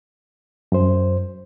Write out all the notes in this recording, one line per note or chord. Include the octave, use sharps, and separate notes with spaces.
F#2 C5